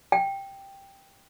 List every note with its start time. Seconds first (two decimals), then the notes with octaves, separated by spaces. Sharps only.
0.12 G5